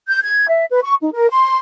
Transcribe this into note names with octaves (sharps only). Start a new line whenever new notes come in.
G6
G#6
E5
B4
C#6
D#4
A#4
C6